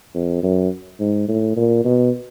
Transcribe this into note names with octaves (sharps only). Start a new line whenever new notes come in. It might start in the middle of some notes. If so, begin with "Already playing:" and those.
F2
F#2
G#2
A2
A#2
B2